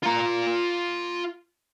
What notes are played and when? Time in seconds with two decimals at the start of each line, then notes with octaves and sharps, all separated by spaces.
0.03 F4 A#5